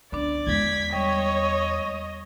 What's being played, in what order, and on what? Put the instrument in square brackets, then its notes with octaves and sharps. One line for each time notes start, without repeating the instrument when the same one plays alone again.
[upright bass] C#2 [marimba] D3 B3 D4 [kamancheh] D5
[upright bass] E2 G#3 [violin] G#6 B6
[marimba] G3 [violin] C#5 [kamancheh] D#5